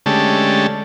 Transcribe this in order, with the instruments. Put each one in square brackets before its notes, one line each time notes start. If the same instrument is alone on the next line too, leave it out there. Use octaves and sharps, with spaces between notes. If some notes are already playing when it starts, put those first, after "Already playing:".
[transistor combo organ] D3 G#3 A3 C#4 G4 A5